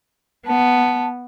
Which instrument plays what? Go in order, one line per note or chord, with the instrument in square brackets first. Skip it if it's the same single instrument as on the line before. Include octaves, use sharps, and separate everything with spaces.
[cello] B3 [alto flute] A5